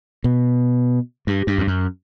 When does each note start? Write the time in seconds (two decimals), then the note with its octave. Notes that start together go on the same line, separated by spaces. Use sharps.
0.24 B2
1.27 G2
1.47 G2
1.58 F2
1.67 F#2